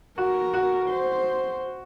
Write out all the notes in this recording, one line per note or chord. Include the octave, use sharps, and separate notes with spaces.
F#4 A#4
F#4
C5